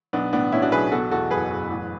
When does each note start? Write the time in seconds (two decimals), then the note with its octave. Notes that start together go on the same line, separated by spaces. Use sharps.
0.13 B1 B3 D4
0.33 A2 B3 D4
0.52 A2 C#4 E4
0.62 D4 F#4
0.72 B1 G#4 B4
0.92 B2 F#4 A4
1.11 E2 F#4 A4
1.31 F#1 G#4 B4
1.50 F#1
1.70 A1